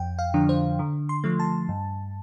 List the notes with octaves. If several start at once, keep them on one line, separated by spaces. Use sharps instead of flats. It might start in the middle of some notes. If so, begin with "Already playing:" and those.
Already playing: F2 G5
F5
D3 F3 D4
C5
D3
C6
F3 A3
A5
G2